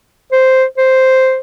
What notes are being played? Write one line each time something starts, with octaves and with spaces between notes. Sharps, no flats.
C5
C5